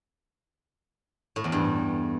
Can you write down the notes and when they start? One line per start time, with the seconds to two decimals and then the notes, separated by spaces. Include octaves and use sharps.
1.36 A2
1.44 E2
1.52 G2